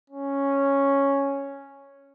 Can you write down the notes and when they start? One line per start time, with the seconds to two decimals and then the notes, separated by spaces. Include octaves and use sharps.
0.10 C#4